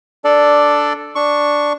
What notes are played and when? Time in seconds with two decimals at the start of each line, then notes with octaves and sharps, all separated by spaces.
0.24 D4 A4 D5
1.15 D4 C#6